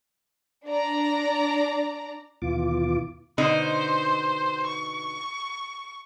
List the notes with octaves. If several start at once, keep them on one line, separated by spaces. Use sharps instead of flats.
D4 D5 A#5
D#2 B2 E3 F4 D6
B2 D3 D#4 C5
C#6